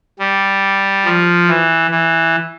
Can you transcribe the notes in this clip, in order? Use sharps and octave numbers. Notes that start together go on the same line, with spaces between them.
G3
F3
E3
E3